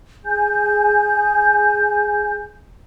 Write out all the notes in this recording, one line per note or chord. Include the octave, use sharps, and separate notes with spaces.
G#4 G#5 G6